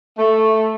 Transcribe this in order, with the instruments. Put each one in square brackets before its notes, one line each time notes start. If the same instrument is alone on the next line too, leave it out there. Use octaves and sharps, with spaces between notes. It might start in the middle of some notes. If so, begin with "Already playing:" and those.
[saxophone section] A3